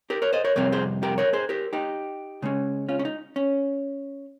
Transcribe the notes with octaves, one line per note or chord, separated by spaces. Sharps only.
G4 A#4
A#4 C#5
C5 D#5
A#4 C#5
F2 C3 G3 C4 A#4 C#5
G#4 C5
G4 A#4
A#4 C#5
G#4 C5
G4 A#4
D#4 G4
C#3 G#3 C#4
C#4 F4
C#4
D#4
C#4